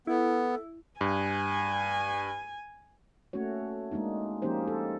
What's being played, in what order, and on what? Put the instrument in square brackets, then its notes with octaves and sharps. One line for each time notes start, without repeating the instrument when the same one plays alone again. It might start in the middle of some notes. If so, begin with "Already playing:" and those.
[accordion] B3 [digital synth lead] E4 [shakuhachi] A4
[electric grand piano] G2 [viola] G#5
[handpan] A3 A#3 C#4 F#4 C#5
G#3 A#3 D4 D#4
F3 A#3 C#4 D#4 G4 C5
A4